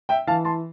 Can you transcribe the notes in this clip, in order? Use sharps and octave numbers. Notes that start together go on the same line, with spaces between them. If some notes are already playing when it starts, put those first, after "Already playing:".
E5 G5
E3 F5 A5
A5 C6